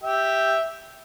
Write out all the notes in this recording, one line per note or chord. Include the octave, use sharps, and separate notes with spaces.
G4 E5